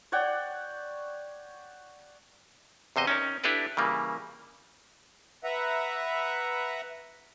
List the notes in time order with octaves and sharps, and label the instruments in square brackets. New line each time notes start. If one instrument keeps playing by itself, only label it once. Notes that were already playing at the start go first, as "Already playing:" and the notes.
[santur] C#5 D5 F#5 G5
[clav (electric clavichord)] E2 C3 C5 D#5
C#4 D#4 A#4
D4 E4 G4 A4 B4 D5
C#3 E3 G3 A#3
[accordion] B4 E5 F#5 A#5